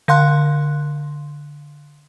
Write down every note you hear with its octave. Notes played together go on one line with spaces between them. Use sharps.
D3 F5 C6 F#6